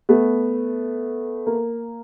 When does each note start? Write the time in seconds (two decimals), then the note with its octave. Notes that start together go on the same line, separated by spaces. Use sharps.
0.09 A3 B3
1.47 A#3